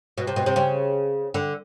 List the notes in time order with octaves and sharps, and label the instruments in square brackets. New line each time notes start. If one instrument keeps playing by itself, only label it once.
[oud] B2
C3
B2
C3
C#3
D3